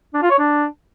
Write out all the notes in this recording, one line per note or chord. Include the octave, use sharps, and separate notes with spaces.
D4
F4
C#5
D4